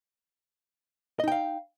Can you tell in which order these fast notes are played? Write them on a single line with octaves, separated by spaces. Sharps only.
D#5 D#4 G5 F5